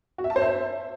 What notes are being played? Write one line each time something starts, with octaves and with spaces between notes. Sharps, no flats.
F#4
E5
A5
C5
E5